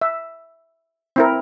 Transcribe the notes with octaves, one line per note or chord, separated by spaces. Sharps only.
E5
C4 E4 A#4